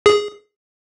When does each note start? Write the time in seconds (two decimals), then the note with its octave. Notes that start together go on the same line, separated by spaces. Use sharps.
0.06 G#4